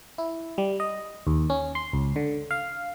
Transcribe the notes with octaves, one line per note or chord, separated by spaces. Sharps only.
E4
G3
D#5
D#2
C#4
C6
C#2
D3
F5